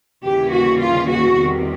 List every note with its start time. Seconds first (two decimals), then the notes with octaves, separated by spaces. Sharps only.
0.23 D#2 C#3 E3 G3 G4
0.51 F#4
0.80 F4
1.09 F#4
1.37 E2 C3 D#3 G3